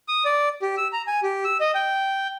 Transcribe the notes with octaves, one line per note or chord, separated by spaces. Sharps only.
D#6
D5
G4
E6
A#5
G#5
G4
E6
D#5
G5